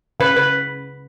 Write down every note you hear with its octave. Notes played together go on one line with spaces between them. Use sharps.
C#3 B4
B4